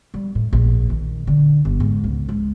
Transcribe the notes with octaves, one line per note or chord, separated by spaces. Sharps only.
G3
A2
A#1
D#3
D3
G1
G#2
C#2
G#3